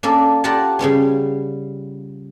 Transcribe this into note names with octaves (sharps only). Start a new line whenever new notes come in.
A#3 C#4 D4 A4
F4 G4 A#4 D5 F#5 A5
C#3 G3 B3 C#4